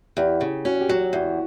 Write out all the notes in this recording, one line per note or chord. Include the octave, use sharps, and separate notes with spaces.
E2 G4
C#3
C#4 F#4
G4
F#3 F#4
E2